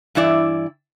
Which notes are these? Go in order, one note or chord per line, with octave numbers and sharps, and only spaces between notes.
G2 E3 E4 D5